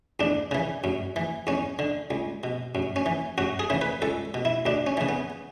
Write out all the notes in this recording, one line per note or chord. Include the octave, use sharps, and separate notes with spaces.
E2 D4
C#3 E3
F#2
E3
E2 C#4
D3
C#2
B2
F#2
C#4
E3
F#2 F#4
G#4
C#3 E3
B4
C#2 A4
B2
E4
D2 D4
C#4
C#3 E3
B3